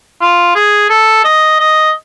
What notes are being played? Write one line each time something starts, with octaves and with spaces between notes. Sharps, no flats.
F4
G#4
A4
D#5
D#5